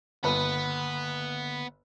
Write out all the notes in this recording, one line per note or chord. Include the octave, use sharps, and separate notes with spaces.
G1 D3 A#3 B3 B4